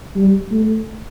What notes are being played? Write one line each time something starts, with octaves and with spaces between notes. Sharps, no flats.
G3
A3